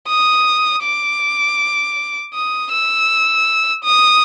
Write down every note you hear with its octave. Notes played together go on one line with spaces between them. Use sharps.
D#6
D6
D#6
E6
D#6